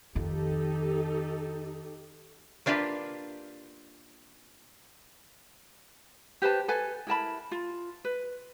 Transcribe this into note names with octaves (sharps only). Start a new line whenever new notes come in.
F2 D#3 D#4 G4 A4
A#3 D4 F4 G4 B4
G4 B4 C5 A5
A4 B4 G#5
E4 A#4 A5 B5
F4
B4